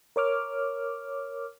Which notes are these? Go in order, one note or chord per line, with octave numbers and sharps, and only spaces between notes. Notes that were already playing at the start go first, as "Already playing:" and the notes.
A#4 C#5 D6 F6